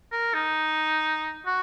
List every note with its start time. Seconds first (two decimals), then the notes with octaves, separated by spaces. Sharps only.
0.12 A#4
0.34 D#4
1.47 F#4